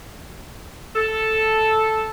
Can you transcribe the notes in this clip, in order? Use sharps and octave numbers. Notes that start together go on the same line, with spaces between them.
A4